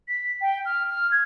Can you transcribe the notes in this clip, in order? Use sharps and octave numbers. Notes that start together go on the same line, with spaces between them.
B6
G5
F6
F6
G#6